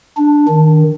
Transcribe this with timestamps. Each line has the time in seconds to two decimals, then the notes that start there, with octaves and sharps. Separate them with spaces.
0.17 D4
0.48 D#3